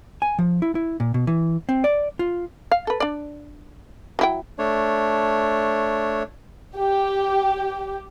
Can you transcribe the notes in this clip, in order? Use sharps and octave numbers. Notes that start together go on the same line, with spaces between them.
G#5
F3
E4
E4
A#2
B2
E3
C4
D5
F4
F5
A4 B4
D4 D5
F#3 E4 G5
A3 D4 C#5
G4